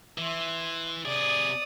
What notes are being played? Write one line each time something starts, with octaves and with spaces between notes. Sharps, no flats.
E3 E5 C6
C3 G#4 D5 D#6